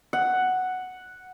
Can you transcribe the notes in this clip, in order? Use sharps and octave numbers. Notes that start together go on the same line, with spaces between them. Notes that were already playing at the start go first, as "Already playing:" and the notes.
F#5